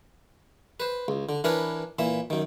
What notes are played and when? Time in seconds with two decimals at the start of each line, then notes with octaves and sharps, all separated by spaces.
0.80 B4 C5
1.08 C#2
1.29 D3
1.44 E3 D4 A#4 B4 C#5
1.99 A#2 E3 E5
2.30 F#2 D#3